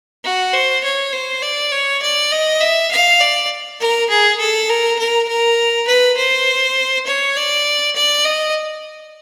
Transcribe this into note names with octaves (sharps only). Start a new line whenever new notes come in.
F#4
C5
C#5
C5
D5
C#5
D5
D#5
E5
F5
D5
A#4
G#4
A4
A#4
A#4
A#4
B4
C5
C#5
D5
D5
D#5